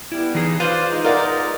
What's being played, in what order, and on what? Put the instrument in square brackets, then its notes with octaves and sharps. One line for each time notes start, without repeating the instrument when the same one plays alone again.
[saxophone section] G3 B3 [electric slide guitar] E4
[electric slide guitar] E3 D#4 G#4
[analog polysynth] F4 [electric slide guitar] B4 [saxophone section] C5 D5
[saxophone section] G#3 D#4
[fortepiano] F4 D5 F#5 [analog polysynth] A#4